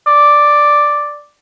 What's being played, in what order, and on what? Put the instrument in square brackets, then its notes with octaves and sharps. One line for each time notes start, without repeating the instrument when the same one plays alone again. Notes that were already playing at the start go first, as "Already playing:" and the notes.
[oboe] D5